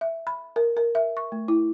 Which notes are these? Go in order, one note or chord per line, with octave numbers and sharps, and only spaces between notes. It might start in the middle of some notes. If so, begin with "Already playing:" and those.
E5
B5
A#4
A#4
E5
C#6
A3
E4